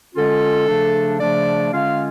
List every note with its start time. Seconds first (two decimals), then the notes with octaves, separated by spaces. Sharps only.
0.15 D3 G#3 C#4 F4 A4
0.68 C#3 F3 A3 D4
1.20 C#3 F3 A3 D4 D5
1.73 D3 G#3 C#4 F4 F5